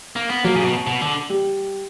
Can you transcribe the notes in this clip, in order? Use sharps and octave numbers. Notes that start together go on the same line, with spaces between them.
A#3
B3
F#3 A#3
C#3
B2
B2
D3
G3